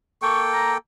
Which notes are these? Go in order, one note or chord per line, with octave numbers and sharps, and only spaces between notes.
A#3 A4 G5 C#6
A#5